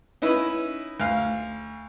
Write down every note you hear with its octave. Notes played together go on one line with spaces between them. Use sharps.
C#4 D#4 E4 B4
D2 F5